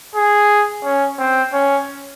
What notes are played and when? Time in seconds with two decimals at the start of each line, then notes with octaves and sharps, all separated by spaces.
0.15 G#4
0.84 C#4
1.19 C4
1.53 C#4